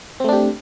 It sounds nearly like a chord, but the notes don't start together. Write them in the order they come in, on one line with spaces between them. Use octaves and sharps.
C4 A3 D4 G4